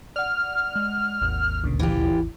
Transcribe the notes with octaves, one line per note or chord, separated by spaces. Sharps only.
D5 F#5 F6
G#3
G#1 D#2
D2 A#2 C#3
E3 F4 G4